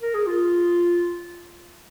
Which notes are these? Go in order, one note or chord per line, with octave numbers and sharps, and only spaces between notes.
A#4
G#4
F4